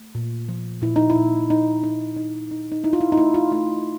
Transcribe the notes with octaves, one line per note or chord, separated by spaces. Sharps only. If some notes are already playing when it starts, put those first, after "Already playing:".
Already playing: A3
A#2
F3
A#2 E4
D#4
E4
A#2
D#4
D#4
D#4
D#4
D#4
D#4 E4
F4
E4
D#4
A3 E4
F4
A3 F4